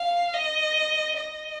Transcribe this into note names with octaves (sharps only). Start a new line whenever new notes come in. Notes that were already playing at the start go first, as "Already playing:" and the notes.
Already playing: F5
D#5
D#5